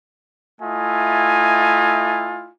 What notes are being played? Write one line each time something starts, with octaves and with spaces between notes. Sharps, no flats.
A3 E4 F4 D#5 G#5